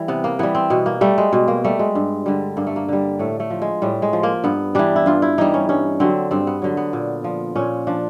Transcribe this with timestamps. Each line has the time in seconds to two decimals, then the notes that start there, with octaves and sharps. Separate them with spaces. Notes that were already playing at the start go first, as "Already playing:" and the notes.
Already playing: E3 G3
0.08 C3 B3
0.24 A#3
0.39 E3 G3 B3
0.55 C4
0.70 B2 B3
0.86 A#3
1.01 G3 A3
1.18 G#3
1.33 B2
1.48 A#3
1.64 G3 A3
1.79 G#3
1.95 G2
2.26 D3 G3
2.57 G2 A#3
2.67 A3
2.76 A#3
2.88 D3 G3
3.19 A2 A3
3.40 A3
3.50 F3
3.62 G#3
3.82 A2 G3
4.02 G#3
4.13 F3
4.23 A#3
4.44 G2 B3
4.75 E3 G3 D4
4.96 E4
5.06 G2 F4
5.22 E4
5.38 E3 G3 D#4
5.54 C#4
5.69 G2 C#4
6.00 D3 F#3 C4
6.31 G2 C4
6.47 B3
6.62 D3 F#3
6.77 B3
6.93 A#2
7.24 F3
7.56 A#2 C#4
7.87 F3 D4